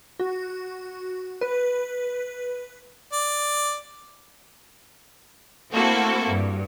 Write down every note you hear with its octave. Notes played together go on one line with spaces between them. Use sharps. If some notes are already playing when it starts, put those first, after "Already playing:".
F#4
B4
D5
A3 A#3 C4 E4 F#4 A4
G2